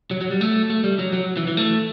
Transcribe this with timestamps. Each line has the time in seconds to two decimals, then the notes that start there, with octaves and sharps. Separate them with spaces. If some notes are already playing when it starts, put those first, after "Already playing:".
0.11 F#3
0.21 F#3
0.31 G3
0.41 A3
0.70 A3
0.84 G3
0.99 F#3
1.13 F#3
1.37 E3
1.47 E3
1.57 A3